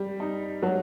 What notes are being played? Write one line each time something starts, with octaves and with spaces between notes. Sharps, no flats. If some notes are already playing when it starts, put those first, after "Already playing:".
Already playing: G3
D#4
F#3